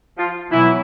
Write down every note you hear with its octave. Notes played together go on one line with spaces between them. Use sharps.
F3 F4
B2 E3 F#3 E4